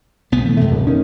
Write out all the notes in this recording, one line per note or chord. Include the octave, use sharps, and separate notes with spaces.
B1 B3
E3 A3
F#2 C3 A3
D1
D#3 C#4